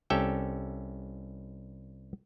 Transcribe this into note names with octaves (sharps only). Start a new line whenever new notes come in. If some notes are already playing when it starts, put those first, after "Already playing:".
C2 C#4 G4 A4 E5 G5